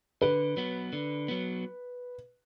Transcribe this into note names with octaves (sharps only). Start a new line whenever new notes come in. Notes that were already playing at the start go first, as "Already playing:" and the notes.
D3 B4
F#3 B3
D3
F#3 B3